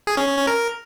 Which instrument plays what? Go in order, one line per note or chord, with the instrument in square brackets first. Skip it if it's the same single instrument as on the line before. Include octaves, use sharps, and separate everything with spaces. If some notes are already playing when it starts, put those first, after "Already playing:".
[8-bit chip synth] G#4
C#4
C#4
C#4
A#4